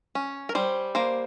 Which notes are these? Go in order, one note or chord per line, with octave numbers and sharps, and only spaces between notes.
C#4
A#4
G3 C5
A#3 C5